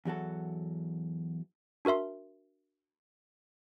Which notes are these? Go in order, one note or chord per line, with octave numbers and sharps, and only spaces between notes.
E2 F#3 F#4 A4
D4 F#4 A#4 E5 C6